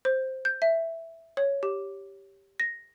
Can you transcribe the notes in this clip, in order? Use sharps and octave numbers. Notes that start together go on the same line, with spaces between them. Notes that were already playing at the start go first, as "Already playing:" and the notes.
C5
G6
E5
C#5
G4
A#6